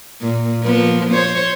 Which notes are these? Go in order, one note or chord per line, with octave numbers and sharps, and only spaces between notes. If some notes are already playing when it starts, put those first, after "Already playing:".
A#2
F3 A#3 B3
C5 C#5